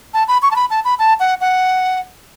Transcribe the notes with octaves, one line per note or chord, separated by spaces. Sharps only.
A5
B5
C#6
A5
B5
A5
B5
A5
F#5
F#5